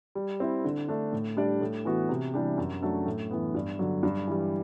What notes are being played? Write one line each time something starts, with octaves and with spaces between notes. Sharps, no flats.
G3
C4 E4
D3
A3 D4
A2
G3 D4 G4 D5
A2
E3 B3 F#4
C3
E3 G3 D4 G4
F#2
F#3 A3 D4 A4
A2
E3 B3
G2
D3 F#3
G2
E3 G3